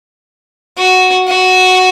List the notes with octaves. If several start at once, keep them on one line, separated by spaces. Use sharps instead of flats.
F#4
F#4